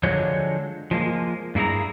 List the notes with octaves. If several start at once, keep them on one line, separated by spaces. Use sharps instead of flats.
D3 F3 F#3 G#3 C5 C#5
F3 G#3 A#3
G2 A#3 E4 G#4 A#5